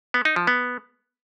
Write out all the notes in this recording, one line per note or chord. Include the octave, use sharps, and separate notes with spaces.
B3
D#4
F3
B3